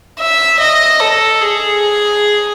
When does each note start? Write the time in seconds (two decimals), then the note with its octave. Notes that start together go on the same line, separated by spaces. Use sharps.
0.20 E5
0.60 D#5
1.00 A4
1.41 G#4